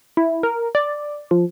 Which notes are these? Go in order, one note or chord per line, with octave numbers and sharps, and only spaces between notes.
E4
A#4
D5
F3